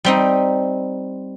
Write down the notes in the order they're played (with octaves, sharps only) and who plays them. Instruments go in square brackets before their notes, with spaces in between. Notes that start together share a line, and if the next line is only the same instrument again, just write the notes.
[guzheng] G3 C4 D#4